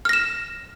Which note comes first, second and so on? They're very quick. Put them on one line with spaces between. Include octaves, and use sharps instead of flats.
F6 A#6 E7